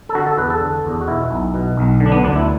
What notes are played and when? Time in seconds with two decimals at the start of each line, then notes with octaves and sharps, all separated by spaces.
0.09 A4
0.15 D3 F#4
0.27 A4
0.38 E2 B4
0.50 A4
0.61 D3
0.85 E2
1.01 F#4
1.08 B2 E4
1.31 B1
1.54 B2
1.77 B1
2.00 D3
2.06 D4
2.12 B3
2.24 D2 D4
2.36 E4